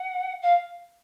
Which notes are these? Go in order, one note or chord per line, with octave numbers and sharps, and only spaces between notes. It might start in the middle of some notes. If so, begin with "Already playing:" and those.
Already playing: F#5
F5